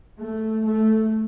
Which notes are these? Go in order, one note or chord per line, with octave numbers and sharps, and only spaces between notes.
A3
A3